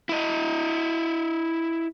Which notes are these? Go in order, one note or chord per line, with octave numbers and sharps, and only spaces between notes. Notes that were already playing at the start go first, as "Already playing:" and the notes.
E4 D#5